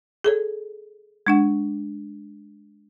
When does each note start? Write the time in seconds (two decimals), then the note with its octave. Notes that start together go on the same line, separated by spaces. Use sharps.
0.24 G#4 A4 C#5
1.27 G#3 D4 F#5